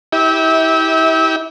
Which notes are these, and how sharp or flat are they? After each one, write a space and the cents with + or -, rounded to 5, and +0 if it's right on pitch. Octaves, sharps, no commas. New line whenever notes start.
E4 -30 G4 +0 E5 -35